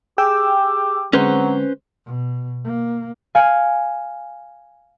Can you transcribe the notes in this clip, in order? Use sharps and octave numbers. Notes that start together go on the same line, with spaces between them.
G4 G#4 G5 E6
D3 F#3 G#3 C4 C#4 B4 C5
B2
A#3
F5 G#5